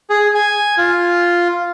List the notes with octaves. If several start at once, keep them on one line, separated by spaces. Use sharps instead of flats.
G#4
G#5
F4